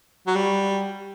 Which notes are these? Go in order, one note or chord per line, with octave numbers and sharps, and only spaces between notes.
F#3
G3